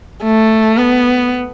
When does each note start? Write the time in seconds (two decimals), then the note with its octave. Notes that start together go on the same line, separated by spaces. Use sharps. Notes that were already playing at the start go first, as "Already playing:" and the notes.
0.23 A3
0.77 B3